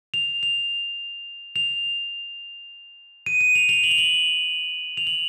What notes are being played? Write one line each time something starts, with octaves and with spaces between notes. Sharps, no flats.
F7
F7
F7
D#7
D#7
F7
F7
F#7
F7
F#7
F7
F#7